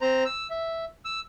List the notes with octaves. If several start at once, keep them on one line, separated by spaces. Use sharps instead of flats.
C4 C5 A#5
E6
E5
E6